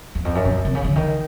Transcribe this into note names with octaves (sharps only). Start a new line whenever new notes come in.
E2
F2
F#2
B2
C3
C#3
D3
D#3